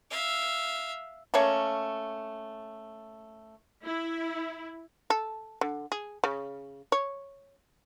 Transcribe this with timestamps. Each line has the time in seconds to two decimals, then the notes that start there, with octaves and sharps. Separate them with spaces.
0.11 E5 F5
1.34 A3 A#3 C#4 C#5
3.84 E4
5.10 A4
5.61 D3
5.92 G#4
6.24 C#3
6.92 C#5